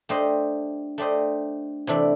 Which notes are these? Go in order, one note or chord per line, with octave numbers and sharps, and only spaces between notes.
A3 D4 G4 C5 D#5
A3 D4 G4 C5 D#5
C3 E3 A3 D4